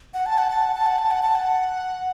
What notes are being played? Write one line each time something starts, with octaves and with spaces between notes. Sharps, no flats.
F#5
A5
F#5
A5
F#5
A5
F#5
A5
F#5
A5
F#5